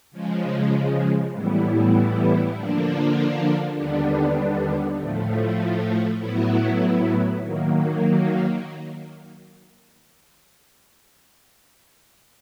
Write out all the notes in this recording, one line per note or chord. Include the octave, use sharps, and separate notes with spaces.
C#3 F3 G#3
A2 E3 G3 B3 E4
D3 F3 A#3 D4
D#2 D3 G3 B3 D4
A2 F3 A3
A2 F#3 B3 E4
D#3 F#3 A#3